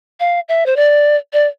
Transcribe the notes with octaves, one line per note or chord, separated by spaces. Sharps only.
F5
E5
C5
D5
D5